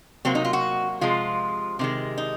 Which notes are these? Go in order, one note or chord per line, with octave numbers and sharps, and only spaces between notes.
C3 F#3 A#3 C4
D#4
F4
F#4
C3 F3 G#3 F4
C3 D#3 G#3
D#4